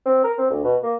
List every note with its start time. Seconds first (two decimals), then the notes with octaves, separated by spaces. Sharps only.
0.05 C4
0.24 A#4
0.38 C4
0.50 D2
0.64 B2
0.83 A#3